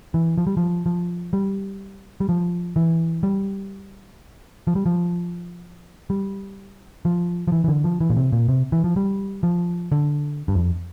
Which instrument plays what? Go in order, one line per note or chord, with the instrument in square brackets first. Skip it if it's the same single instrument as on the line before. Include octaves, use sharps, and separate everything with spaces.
[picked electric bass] E3
F3
G3
F3
F3
G3
G3
F3
E3
G3
F3
G3
F3
G3
F3
F3
E3
E3
D3
F3
E3
A#2
C3
A#2
C3
E3
F3
G3
F3
D3
G2
F2